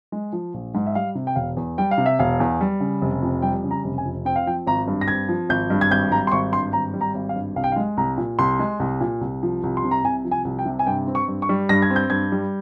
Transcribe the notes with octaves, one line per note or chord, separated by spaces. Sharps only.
G#3
F3
A#1
G#2
E5
G3 F5
C3
G5
E1 F5
E2
G3 G5
F5
C3
E5
E1 F5
E2
G3
C#3
F1
F2
G3 G5
C#3
A#5
F1
G#5
F2
C4 G5
F5
F3 G5
G#1 A#5
G2
A#6
C4 G#6
F3
G#1 G6
G2
G#6
G#1 G6
G3 A#5
C6
G#1 C#6
G2 C6
G#1 A#5
G3
A#5
G#1
F5
G2
C2 F5
G5
F5
G#3
C2 A#5
A#2
C2 C6
G#3
C2
A#2
C2
F3
C2
C6
C3
A#5
C2 G#5
F3
G#5
C2
G5
C3
G#5
G2 G5
C4
C#6
G2
C#6
G3
G2 A#6
G#6
C4
G6
G2 G#6
G3